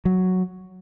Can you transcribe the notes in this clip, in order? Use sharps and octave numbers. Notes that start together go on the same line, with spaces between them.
F#3